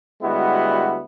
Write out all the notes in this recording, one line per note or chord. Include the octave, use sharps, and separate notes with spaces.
D2 G3 G#3 B3 E4 F#4